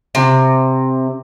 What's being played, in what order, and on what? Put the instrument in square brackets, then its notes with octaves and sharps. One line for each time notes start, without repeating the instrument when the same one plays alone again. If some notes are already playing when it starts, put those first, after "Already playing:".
[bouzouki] C3